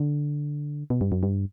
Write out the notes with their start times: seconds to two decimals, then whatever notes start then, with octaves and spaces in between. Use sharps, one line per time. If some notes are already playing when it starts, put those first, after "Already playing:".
Already playing: D3
0.90 B2
1.01 G2
1.12 F#2
1.23 G2